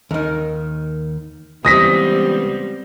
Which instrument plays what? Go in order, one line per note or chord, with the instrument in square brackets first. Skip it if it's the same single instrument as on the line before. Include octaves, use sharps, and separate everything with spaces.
[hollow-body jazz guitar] D#2 D#3
[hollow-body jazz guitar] C#2 E3 [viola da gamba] G3 B3 C4 [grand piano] D#6 A#6 B6